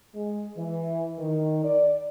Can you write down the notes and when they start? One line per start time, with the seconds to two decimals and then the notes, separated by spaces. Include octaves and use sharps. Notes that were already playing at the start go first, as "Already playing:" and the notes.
0.14 G#3
0.56 E3
1.19 D#3
1.64 D5